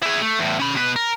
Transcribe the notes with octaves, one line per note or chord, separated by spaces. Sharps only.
E4 G#4
A3
E2 A2
C#4 B5
B2 B4
A#4